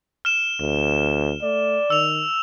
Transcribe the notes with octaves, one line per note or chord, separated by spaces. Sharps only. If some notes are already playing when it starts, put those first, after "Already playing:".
F6 E7
D2
A3 D5
D#3 E6 F7